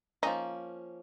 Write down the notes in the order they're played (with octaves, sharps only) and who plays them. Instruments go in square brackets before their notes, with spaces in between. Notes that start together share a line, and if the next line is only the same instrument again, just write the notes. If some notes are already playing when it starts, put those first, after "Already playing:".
[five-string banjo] F3 A#3 C#4 [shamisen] D#4